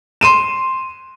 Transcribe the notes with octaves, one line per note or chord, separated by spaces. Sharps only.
C6 D#7 E7